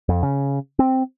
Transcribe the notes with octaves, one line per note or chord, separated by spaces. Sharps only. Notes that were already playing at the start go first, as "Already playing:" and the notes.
F2
C#3
C4